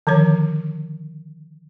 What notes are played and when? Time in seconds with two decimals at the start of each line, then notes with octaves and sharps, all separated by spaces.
0.07 D3 D#3 F3 C#5